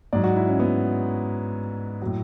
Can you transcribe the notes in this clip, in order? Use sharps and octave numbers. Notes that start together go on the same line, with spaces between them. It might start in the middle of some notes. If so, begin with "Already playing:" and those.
G#2 F#3 D5
F#4
E4
C#4
B3
A2 F#3